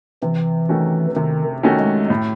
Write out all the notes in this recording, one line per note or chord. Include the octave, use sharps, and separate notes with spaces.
C3 E3
D#3 A3 C#4 F#4
C3 D#3
D#3 A3 C#4 F#4
G#3
A2